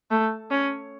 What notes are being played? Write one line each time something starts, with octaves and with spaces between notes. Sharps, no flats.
A3
C#4